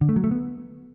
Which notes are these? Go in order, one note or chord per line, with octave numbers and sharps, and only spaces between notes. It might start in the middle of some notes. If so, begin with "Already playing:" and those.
D3
A3
F#3
A3
B3